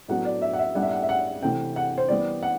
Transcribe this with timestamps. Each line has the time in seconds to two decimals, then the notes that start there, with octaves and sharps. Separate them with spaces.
0.08 A2 F#3 B3 D4 F#5
0.25 D5
0.42 E5
0.53 F#5
0.59 E5
0.75 A2 G3 B3 D4 F#5
0.83 E5
0.91 F#5
1.03 E5
1.09 F#5
1.42 C3 E3 A3 C4 G5
1.76 F#5
1.98 C5
2.08 E3 G3 B3 D5
2.43 F#5